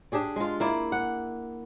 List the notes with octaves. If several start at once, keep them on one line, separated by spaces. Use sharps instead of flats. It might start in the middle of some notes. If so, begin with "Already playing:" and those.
D4 G4 G#4 D5
G#3 F4
A#3 E4 D5
F#5